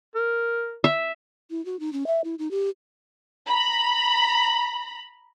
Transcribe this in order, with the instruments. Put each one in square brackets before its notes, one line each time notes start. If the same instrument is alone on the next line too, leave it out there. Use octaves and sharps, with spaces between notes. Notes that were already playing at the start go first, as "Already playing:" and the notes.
[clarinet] A#4
[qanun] E5
[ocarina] E4
F#4
D#4
C#4
E5
E4
D#4
G4
[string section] A#5 B5